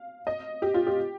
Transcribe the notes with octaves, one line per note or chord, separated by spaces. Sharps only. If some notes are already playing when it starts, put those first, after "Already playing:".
Already playing: F5
D#5
G4
F4
G4